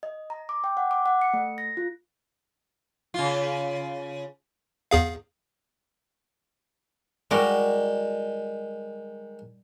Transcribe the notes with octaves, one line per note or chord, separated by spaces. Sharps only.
D#5
A#5
D6
G5
F#5
D6
F#5
C#7
A3
A#6
F4
C#3 F4
E2 G#4 F5
D#3 G3 G#3 F#4 A#4